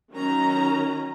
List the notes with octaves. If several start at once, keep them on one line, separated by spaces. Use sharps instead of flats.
D#3 F#3 C#4 A#5